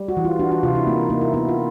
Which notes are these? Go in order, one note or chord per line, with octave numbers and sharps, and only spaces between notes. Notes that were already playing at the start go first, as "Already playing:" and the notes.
Already playing: G3
F#4
E3
F4
D4 F#4
F#4
C3 F4
E4
A#3 D#4
A#3 D#4
E4
B3 E4
F4